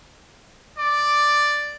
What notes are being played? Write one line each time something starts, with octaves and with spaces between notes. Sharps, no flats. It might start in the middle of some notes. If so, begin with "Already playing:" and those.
D5 D6